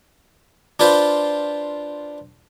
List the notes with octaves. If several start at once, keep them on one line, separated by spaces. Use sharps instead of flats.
D4 F4 B4 C5